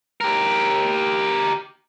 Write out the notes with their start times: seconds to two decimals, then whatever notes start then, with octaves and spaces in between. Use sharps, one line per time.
0.21 G4 A#4